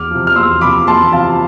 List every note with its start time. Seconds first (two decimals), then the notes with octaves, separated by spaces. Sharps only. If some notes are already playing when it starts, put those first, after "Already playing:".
Already playing: E2 D6 F6
0.11 C3 F3
0.27 F6
0.36 E2 C6 E6
0.61 C3 F3 B5 D6
0.87 E2 A5 C6
1.13 C3 F3 F5 A5